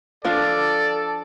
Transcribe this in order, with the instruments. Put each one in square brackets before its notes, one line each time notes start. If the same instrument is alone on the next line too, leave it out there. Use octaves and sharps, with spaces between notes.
[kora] F3 D4 F5 [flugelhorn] A4 [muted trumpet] D5